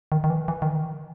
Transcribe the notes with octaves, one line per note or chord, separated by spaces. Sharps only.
D#3
D#3
E3
E3
D#3